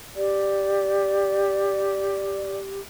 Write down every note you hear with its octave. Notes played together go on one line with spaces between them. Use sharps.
G4 D5